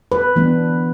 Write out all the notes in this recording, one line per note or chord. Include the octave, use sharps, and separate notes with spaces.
B4
E3 B3 D4